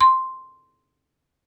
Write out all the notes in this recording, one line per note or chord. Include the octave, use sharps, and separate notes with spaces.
C6